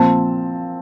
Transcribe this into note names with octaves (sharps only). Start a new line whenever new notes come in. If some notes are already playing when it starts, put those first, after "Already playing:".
Already playing: A#2 F3 C4 A5